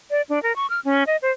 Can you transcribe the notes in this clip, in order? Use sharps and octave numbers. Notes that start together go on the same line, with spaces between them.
D5
D4
A#4
C#6
F6
C#4
D#5
C5